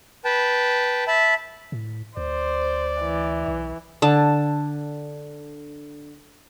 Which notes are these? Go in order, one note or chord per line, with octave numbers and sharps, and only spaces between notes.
B4 G5 A5
E5 A5 B5
A2
D2 C5 D5
E3
B1
D3 A5